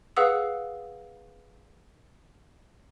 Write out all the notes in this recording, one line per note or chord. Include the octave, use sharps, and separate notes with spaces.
G#4 B4 F5 F#5 D#6 E6